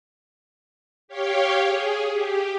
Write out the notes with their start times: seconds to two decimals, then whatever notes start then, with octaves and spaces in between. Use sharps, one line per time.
1.08 G4 C#5 F5 G5
1.65 G#4
2.12 G4